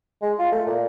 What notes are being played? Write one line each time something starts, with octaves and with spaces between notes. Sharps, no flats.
G#3
F4
A3
A#2